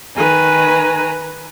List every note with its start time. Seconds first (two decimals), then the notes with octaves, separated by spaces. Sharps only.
0.16 D#3 B4 G#5 A#5